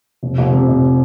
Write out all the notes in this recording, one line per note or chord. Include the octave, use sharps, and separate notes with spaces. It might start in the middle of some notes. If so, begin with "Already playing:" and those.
F1
F1
C3
F1